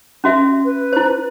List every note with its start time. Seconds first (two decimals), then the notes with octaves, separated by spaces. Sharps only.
0.24 C#4 F#4 E5
0.65 B4
0.93 E4 C5